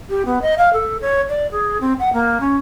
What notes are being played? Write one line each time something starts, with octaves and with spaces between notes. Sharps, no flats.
G4
B3
D#5
F5
A4
C#5
D5
G#4
C4
F#5
A#3
C#4